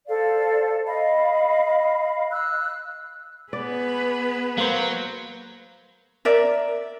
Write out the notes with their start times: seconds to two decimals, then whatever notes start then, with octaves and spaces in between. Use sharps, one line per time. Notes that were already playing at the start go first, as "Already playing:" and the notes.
0.07 A4 C5 D5 F5
0.86 D#5 F5 B5
2.30 E6 F#6
3.53 B3 G#4 B4 D5
4.58 F#3 A#3 C5
6.25 A#4 D5 E5